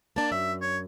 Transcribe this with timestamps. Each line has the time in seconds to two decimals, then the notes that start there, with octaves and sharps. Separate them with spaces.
0.16 A#3 D4 A5
0.32 F#2 E5
0.61 C#5